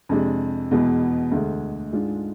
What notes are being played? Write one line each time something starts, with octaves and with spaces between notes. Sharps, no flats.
F2 C3 G#3 D4
E2 B2 G#3 B3
D2 D3 G#3
G#2 G#3 D4 F4